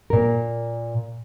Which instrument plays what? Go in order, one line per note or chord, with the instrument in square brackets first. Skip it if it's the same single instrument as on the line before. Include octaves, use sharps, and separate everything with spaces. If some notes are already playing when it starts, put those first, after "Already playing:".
[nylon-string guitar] A#2 A#4